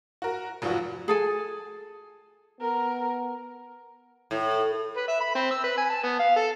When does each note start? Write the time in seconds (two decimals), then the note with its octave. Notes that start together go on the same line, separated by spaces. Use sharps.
0.22 F#4 A#4
0.62 F1 F3 F#3 F4 F#4
1.08 G#4 A4 G#5
2.61 B3 A#4
4.31 A2
4.97 B4
5.08 E5
5.20 B5
5.35 C4
5.51 E6
5.64 B4
5.78 G#5
5.90 A5
6.03 B3
6.19 F5
6.36 A4